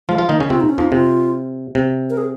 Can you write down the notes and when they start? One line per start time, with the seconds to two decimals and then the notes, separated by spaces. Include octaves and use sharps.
0.08 F3 G#3 F4
0.18 F3 F4
0.29 D#3 A#3 D#4
0.40 C#3 C#4
0.50 C3 C4 F4
0.61 D#4
0.69 C#4
0.78 F2 F3 D#4
0.92 C3 F4
1.75 C3
2.10 A#4
2.17 G#4